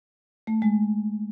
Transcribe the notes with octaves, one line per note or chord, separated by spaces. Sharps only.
A3
G#3